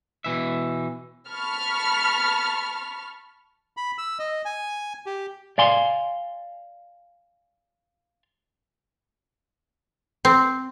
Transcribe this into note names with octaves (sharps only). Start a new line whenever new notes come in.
B2 E3 E5
A5 B5 C#6 F6
B5
E6
D#5
G#5
G4
D5 F5 G#5 C6
C4